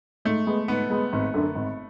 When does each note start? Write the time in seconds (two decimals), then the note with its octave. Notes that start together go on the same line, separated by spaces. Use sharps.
0.25 G#2 A3
0.47 G#3 B3
0.68 G#2 B3
0.90 G#3 B3
1.13 G#1
1.34 F#2 D3
1.55 G#1